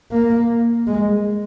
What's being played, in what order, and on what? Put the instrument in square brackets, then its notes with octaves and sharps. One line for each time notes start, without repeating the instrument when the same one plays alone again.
[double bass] A#3
G#3